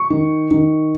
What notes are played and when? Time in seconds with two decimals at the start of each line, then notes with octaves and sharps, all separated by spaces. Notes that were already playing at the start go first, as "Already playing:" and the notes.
Already playing: C#6
0.10 D#3
0.51 D#3